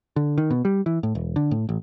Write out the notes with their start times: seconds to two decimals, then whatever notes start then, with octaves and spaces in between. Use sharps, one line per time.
0.16 D3
0.38 D#3
0.51 B2
0.65 G3
0.86 E3
1.03 A2
1.15 E1
1.36 D3
1.51 A2
1.69 A1